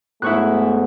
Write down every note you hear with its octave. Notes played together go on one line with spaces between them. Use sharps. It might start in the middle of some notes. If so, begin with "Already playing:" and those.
G#2 B2 F#3 A3 E4 C#6 F#6